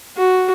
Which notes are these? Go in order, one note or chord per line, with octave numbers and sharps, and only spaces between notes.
F#4